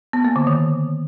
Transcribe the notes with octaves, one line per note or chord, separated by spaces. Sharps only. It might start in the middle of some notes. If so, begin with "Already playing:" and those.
B3
A#3
D3
D#3